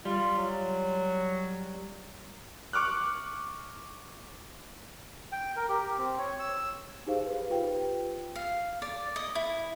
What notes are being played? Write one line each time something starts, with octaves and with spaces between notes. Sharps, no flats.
G3 F4
F#3
C#6 D6 F6 F#6
G5
A#4
G4
C4
C#5
E6
D#4 G4 G#4 C5 F5
B4
F4 G4 B4 G5
F5
D5
D#5
E4